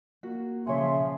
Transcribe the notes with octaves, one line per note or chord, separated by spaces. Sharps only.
A#3 F#4
C#3 F3 G#4 C#5 E5 C6